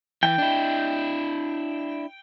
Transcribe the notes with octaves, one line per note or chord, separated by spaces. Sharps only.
E3 G5
D4 E4